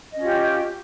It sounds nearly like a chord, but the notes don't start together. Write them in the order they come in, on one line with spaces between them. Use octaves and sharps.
D#5 C#4 F4 G4